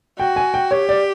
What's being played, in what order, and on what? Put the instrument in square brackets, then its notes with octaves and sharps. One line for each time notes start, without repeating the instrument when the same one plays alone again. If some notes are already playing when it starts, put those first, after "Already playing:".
[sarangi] F#4 [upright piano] G5
[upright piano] G#5
G5
[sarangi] G4 [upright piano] C#5
[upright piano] D5